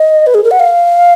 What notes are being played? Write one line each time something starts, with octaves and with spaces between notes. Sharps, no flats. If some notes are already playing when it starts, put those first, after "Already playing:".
Already playing: D#5
B4
G#4
A#4
F#5
F5